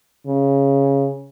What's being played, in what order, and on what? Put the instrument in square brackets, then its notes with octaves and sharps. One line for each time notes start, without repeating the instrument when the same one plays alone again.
[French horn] C#3